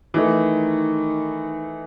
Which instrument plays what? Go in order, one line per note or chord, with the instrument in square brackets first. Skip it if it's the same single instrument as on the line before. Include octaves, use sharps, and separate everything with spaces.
[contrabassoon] D#3 [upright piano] E3 A3 D#4